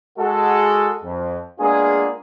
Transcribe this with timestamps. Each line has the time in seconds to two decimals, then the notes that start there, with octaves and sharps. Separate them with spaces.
0.19 G#3 F#4 G#4 A4
1.04 F2
1.60 G#3 A#3 B3 D4 F4 G#4